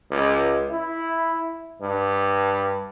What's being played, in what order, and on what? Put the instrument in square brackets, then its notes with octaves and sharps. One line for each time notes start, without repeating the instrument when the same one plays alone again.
[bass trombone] C#2
E4
G2